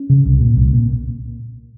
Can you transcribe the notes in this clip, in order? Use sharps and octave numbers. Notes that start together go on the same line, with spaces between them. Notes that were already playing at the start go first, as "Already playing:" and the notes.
Already playing: C#4
C#3
C2
A#2
C2
A#2